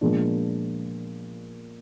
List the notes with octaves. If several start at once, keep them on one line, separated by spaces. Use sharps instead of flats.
A#2 F3 G#3 B3 D4